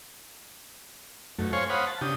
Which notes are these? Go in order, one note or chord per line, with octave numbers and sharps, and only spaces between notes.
F#2 A3
C5 C#5 F5 G#5 C#6
C5 C#5 F5 F#5 B5 D#6
A5
C#3 D4 G4 D#6